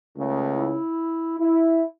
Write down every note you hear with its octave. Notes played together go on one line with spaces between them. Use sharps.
C#2 C#3 A3
E4
E4